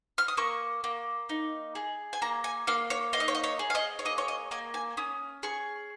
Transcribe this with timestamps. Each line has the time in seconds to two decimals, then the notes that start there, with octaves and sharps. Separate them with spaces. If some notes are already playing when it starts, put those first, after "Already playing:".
0.18 F6
0.28 D#6
0.37 A#3 C#6
0.84 A#3
1.29 D#4
1.75 G#4
2.13 G#5
2.22 A#3 A#5
2.44 G#5
2.67 A#3 F5
2.90 C#5
3.13 D#4 F5
3.20 D#5
3.28 C#5
3.35 D#5
3.44 C#5
3.59 G#4
3.70 F5
3.75 D#5
3.99 C#5
4.05 A#3 D#5
4.18 C#5
4.28 D#5
4.51 A#3 G#5
4.74 G#5
4.97 C#4 D#6
5.43 G#4 C#6